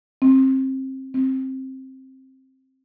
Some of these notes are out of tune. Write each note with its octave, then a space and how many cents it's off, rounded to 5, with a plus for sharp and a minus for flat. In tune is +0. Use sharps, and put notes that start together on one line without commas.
C4 +25
C4 +15